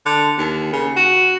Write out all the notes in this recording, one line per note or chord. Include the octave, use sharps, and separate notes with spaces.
D3
D#2
C#3
F#4